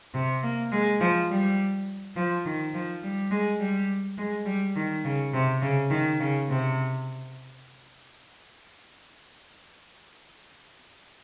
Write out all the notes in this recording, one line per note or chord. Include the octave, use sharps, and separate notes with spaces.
C3
A#3
G#3
F3
G3
F3
D#3
F3
G3
G#3
G3
G#3
G3
D#3
C#3
C3
C#3
D#3
C#3
C3